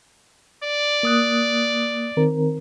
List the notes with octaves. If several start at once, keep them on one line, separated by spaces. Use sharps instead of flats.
D5
A#3 D#6 F#6
D#3 C4 A#4